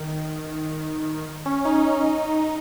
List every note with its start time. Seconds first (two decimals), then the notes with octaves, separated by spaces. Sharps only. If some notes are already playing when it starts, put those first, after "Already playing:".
Already playing: D#3
1.46 C#4
1.65 D#4
2.42 D#4